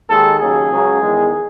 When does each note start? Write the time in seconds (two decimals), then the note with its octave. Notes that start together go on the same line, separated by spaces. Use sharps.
0.10 D#2 D#3 G#3 A4
0.40 D#2 C#3 F#3 G#4
0.71 C#2 C#3 F#3
1.01 E2 D#3 G#3